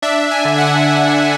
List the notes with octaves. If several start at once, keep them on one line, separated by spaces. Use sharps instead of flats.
D4 E5
G#5
D3
F#5